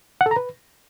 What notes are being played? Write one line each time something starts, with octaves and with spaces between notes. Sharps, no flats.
F#5
A4
A#5
B4